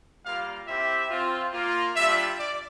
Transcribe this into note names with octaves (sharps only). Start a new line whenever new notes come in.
G3 A#3 F4 F5
C4 E4 G4 E5
C4 F4
A#3 F4
G3 D4 F4 E5
D5